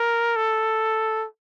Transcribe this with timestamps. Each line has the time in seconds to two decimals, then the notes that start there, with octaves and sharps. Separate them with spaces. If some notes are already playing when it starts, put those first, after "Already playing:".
Already playing: A#4
0.36 A4